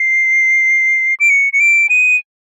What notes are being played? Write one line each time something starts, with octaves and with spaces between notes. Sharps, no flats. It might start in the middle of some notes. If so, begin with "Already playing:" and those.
Already playing: C7
D7
C#7
C#7
D7
D#7